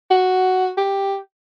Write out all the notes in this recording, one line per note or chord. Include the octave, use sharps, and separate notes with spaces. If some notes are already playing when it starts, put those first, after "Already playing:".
F#4
G4